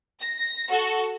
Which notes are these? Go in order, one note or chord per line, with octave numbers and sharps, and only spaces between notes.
A#6
F#4 A4